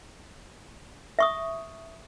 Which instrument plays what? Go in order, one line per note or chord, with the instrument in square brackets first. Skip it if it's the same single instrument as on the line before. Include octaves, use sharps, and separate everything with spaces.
[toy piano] E5 C#6 D#6